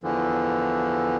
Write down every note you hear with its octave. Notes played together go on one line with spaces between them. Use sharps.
E2 D3 E3 F3